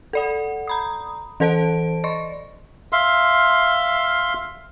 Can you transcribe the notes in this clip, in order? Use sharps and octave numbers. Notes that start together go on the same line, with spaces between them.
A4 D5 F#5
A#5 B5 D#6
E3 A4 C5 A5 D7
D5 D#5 C6 C#6
E5 F5 C6